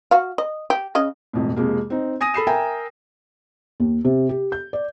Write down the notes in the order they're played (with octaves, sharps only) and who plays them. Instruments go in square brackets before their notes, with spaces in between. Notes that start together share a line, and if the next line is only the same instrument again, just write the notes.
[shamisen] F#4 F5
D#5
G4
C#3 C#4 D#5
[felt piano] E1 F2 A2
F2 C3 G#3 A#3
C4 D#4
G#5 D#6 A#6 D#7
A4 B5 C7 E7
A#4 E5 G5 G#5 A#5
D#2
C3
G4
G6
D5